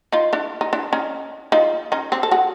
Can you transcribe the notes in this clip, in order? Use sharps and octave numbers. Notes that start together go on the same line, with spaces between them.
D#4 F4
D4 E4
D#4
D4 E4
C#4 D#4
D#4 F4
C#4 D#4
C4 D4
A4
F#4 G#4